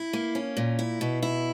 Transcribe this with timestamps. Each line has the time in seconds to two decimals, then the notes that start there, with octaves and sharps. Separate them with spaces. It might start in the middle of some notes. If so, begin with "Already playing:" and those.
Already playing: E4
0.13 A#3
0.35 C#4
0.57 A#2
0.79 E4
1.01 B2
1.22 E4